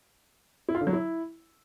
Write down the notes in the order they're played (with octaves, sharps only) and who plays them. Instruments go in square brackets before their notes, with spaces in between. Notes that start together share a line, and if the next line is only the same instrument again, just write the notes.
[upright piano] E4
F4
D3
F#3
E4